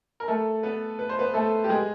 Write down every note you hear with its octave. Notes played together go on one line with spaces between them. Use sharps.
A#4
A3 A4
B3 B4
B4
C5
B3 B4
A3 A4
G4
G#3 G#4